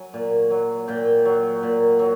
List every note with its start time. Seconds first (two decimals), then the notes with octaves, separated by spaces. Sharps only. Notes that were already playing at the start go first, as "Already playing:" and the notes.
Already playing: F#3 G#5
0.14 A#2
0.50 F#3
0.88 A#2 G5
1.25 F#3
1.63 A#2
1.99 F#3